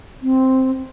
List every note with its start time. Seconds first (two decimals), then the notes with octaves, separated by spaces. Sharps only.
0.22 C4